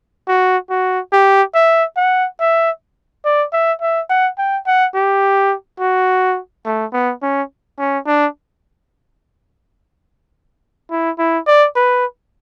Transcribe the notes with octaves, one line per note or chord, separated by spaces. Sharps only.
F#4
F#4
G4
E5
F#5
E5
D5
E5
E5
F#5
G5
F#5
G4
F#4
A3
B3
C#4
C#4
D4
E4
E4
D5
B4